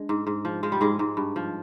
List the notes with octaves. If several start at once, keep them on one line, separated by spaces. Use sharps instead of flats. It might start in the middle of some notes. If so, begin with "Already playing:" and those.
Already playing: G#3 D4
G#2
G#2
F3
F3 G#3
G3
G#2 G#3
G#2
G2
F3